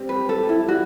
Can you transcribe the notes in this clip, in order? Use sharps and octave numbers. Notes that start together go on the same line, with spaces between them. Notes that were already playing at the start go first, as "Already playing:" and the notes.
Already playing: G3 C4 G4
B4
G4
A4
G4
E4
G3 F#4